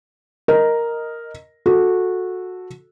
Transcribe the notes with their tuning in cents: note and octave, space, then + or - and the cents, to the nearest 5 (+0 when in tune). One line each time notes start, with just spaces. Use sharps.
A#4 +0 D#5 +0
F#4 -15 A4 +0